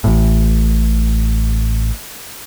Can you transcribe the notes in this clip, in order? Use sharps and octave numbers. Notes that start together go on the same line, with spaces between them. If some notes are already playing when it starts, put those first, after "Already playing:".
A1 A2